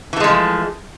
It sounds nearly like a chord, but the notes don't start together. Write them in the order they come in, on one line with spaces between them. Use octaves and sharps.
E3 A3 G#3 F3